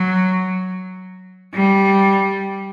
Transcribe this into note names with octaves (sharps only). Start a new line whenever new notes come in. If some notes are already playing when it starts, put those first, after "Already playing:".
Already playing: F#3
G3